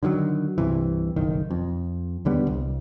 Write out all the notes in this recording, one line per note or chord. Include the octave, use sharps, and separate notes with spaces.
D3 D#3 F3 F#3
C2 G2 C3 E3
F#1 B1 D#3
F2
D#2 D3 G3 B3
C2